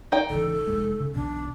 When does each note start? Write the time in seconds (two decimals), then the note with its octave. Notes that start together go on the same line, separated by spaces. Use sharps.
0.12 D#4 D5 G5
0.30 G#1 C#3 E3 A4
0.67 F1 E2 G#3
1.00 C#3
1.15 B1 E2 B2 D4